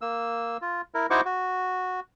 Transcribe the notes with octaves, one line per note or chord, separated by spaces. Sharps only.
A#3 E6
F4
E4 A#4
D#4 E4 F#4 C5 C#6 D6
F#4